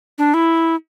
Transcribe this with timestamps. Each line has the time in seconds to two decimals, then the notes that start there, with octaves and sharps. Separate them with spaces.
0.18 D4
0.34 E4